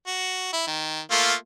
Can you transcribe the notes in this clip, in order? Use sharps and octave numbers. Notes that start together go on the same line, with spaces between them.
F#4
E4
D#3
A3 A#3 F4